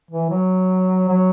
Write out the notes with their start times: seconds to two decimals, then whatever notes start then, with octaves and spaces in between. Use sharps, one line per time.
0.11 E3
0.30 F#3
1.08 F#3